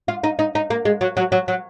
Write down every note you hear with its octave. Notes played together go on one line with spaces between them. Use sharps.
F4
D#4
D#4
D#4
A#3
G#3
F#3
F#3
F#3
F#3